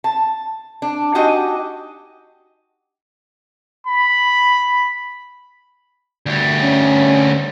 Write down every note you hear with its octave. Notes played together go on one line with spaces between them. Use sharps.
A5
D4
D4 D#4 F#4 G4 D#5 G#5
B5
D2 G3
C#4